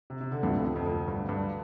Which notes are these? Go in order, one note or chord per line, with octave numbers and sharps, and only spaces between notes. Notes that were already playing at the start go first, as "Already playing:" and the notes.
C3
C3
D3
D2 G2 C3 F3 A3 C4
A2
F2
F2
F2
G2
G2